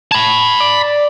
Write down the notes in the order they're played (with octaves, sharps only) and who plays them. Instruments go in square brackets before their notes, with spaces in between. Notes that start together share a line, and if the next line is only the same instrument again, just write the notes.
[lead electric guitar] A5 B5 [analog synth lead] G#6
[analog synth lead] D5